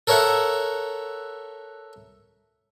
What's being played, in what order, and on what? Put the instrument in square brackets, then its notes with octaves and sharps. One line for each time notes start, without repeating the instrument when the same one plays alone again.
[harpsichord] A4 A#4 C#5 E5 F#5